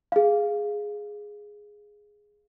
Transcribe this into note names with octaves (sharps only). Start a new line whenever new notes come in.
G#4 F5